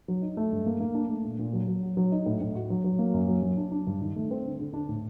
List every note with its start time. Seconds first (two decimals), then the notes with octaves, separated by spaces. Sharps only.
0.08 F#3
0.22 D#4
0.37 A3
0.52 G2
0.66 A#3
0.80 A#3
0.95 D4
1.09 A3
1.25 A#2
1.39 A#2
1.53 F#3
1.68 F#3
1.83 F#4
1.97 F#3
2.12 D#4
2.26 A2
2.41 A2
2.55 F#4
2.70 F#3
2.84 F#3
2.99 A#3
3.14 F#2
3.28 F#3
3.42 F#3
3.57 D4
3.72 D4
3.87 G2
4.01 D#3
4.16 A3
4.31 C4
4.45 D3
4.59 D3
4.74 D4
4.89 A2